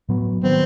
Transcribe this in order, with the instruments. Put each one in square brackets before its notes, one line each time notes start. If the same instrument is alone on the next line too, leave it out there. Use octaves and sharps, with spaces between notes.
[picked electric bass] A2 F#3 B3
[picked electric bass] D#3 F#3 B3 D4 [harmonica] C4